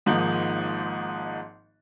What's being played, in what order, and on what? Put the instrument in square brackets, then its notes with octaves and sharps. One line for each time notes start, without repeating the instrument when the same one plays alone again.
[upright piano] G#1 G#2 F3 A#3 D#4